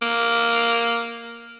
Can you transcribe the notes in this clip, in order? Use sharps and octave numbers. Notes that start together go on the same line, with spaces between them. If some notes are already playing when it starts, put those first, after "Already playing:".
A#3